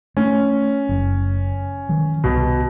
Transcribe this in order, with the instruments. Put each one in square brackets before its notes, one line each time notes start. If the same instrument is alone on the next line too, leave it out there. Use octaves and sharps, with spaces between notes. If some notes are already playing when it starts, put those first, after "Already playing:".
[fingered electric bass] A3 [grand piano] C#4
[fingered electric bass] F#1 F#2
D#3 F#3
[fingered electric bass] C2 [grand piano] B2